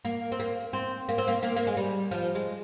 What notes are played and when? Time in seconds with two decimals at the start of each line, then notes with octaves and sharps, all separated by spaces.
0.05 A#3
0.32 C4
0.40 A#3
0.73 C4
1.09 A#3
1.18 C4
1.28 A#3
1.43 A#3
1.56 A#3
1.67 G#3
1.77 G3
2.11 F3
2.35 G#3